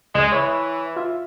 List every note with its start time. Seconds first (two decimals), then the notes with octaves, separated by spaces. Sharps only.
0.15 C#2 G#3
0.32 E3 C#5 E5 B5
0.96 F4 E5